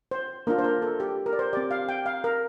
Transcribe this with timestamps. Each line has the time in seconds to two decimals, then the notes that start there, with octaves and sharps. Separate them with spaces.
0.11 C5
0.47 A#3 D4 F4 A#4
0.59 C5
0.64 A#4
0.82 A4
1.00 G4
1.26 A#4
1.33 D5
1.39 C5
1.53 C4 G4 D5
1.71 F5
1.89 G5
2.06 F5
2.24 A#4